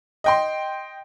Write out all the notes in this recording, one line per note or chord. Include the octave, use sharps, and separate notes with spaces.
D#5 G5 C6